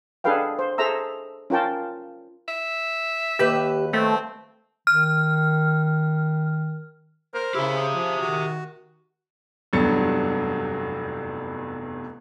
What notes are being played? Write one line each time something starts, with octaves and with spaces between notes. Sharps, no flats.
D4 G#4 A4 B4 F5 G5
C5
G#4 A4 C5 E5 A#5 E6
C#4 F4 A#4 G5 A5
E5
D#2 G4 B4
A3 C4
D#3 F6
A#4 C5
C#3 E4 G4 E5
G#4
F3
D#3 F#4
F1 E2 G2 F#3 A6 C#7